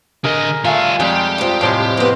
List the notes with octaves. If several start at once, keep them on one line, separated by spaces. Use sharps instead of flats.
D3 G#4 A#4 D#5
G3 A3 F4 F5 G#5
F2 G3 G#3 G4
G2 F3
A2 C3 G#3 C5 A5
D3 B3 C5 D#5